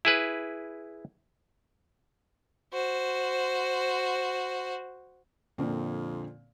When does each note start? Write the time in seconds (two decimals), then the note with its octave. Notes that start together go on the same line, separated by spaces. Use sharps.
0.05 E4 G#4 B4
2.73 F#4 C5
5.58 F2 A#2 D3 C4